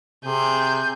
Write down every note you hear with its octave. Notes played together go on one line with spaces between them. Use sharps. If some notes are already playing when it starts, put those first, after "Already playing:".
C3 G#4 G6